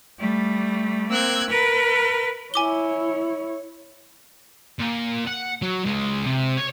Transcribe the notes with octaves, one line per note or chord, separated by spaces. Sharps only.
G3 A3
A#3 C4 E6 F#6 G#6
A#4 B4
E4 C#5 G#5 D6 G7
A#2
F#5
F#3
C#2 G#3
C3
C#5